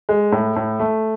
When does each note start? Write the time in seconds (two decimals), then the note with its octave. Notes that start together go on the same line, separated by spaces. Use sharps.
0.09 G#3
0.32 A2
0.56 A2
0.80 A3